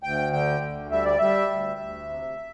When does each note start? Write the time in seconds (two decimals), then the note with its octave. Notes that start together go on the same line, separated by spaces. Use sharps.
0.03 D2 G5
0.33 D3 G5
0.62 D2
0.92 G3 E5
1.05 D5
1.18 G3 E5
1.51 D2
1.80 D2
2.09 C3